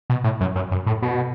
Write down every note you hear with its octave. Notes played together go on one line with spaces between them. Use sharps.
B2
A2
F#2
F#2
F#2
A2
B2